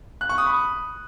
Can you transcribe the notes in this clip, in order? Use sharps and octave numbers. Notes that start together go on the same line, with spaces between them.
F#6
C#6
D#6
B5